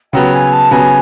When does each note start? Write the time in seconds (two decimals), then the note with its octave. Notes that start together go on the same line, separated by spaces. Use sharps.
0.13 C#3 F#3 B3 G5
0.33 G#5
0.52 A5
0.71 C#3 F#3 B3 G#5